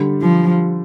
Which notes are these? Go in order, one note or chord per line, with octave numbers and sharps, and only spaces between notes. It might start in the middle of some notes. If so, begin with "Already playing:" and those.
Already playing: D3 G3
F3